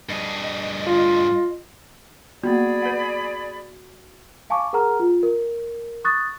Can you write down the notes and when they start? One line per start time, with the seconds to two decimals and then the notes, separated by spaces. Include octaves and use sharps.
0.09 G2 G#4 D#5
0.87 F4
2.44 A#3 B3 F#4 G#4 D5 B5
2.82 B4 F#5
4.50 F5 G#5 A5 C#6 D6
4.73 G#4 A#4 F#5 A#5 F6
5.00 F4
5.23 A#4
6.05 C#6 D#6 F#6 A6